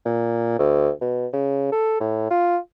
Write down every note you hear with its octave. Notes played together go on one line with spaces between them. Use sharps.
A#2
D2
B2
C#3
A4
A2
F4